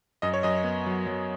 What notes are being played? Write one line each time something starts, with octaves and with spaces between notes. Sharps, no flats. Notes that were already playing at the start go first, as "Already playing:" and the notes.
F#2 D#5
C#5
F#2 D#5
B3
F#3
F#3